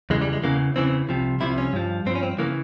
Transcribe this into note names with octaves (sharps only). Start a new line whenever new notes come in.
E2 C#3 E3 G#3
G3
G#3
E2 C#3 E3 A#3
E2 C#3 E3 C4
C2 C3 F3
C2 C3 F3 E4
C#4
G2 F3
G2 F3 C4 C#4
C4
C#3 E3 A#3